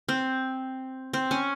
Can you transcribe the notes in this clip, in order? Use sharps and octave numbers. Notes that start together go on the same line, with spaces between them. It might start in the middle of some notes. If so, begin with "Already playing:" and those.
C4
C4
C#4